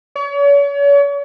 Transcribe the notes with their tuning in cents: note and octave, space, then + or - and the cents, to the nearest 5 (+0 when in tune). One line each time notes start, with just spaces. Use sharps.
C#5 +40